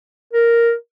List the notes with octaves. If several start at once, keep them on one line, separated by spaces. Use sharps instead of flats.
A#4